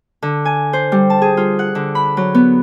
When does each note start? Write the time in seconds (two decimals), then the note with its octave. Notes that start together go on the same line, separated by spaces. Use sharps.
0.22 D3
0.45 G#5
0.73 C5
0.92 G3
1.10 A5
1.22 G#4
1.37 F4
1.59 F#5
1.75 D3
1.95 B5
2.17 F#3
2.35 B3